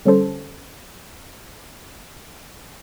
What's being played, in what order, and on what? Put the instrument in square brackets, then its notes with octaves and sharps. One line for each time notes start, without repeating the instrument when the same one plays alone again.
[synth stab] D3 G3 C#4 A4 C5